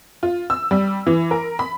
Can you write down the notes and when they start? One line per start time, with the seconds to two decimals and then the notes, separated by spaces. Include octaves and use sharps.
0.23 F4
0.50 E6
0.71 G3
1.07 E3
1.31 A#4
1.59 B5